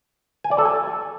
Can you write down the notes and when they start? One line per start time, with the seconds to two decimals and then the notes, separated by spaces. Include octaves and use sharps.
0.44 G#5
0.51 D5
0.58 A4
0.65 G#5